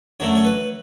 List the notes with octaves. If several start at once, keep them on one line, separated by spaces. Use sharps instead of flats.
F#2 D3 F#3 A3 C#5
C#5
B4